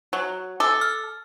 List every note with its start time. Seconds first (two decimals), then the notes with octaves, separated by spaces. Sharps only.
0.13 F#3
0.60 A4 D6
0.81 F6